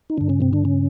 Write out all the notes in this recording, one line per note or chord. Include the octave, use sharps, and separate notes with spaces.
D#4
G2 D3 D4
C#3 C#4
C3 C4
D3 D4
C#3 C#4